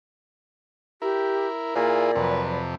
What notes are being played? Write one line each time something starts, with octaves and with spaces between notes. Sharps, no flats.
E4 G4 A#4
A#2 A#3 E4 F4 G#4 D5
F2 C3 F#3 B4